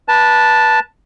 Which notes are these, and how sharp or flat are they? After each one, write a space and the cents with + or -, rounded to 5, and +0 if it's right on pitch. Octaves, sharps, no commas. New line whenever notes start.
B4 -25 A5 +0